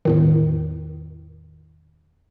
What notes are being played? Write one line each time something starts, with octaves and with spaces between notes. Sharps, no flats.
E2 A2 D#3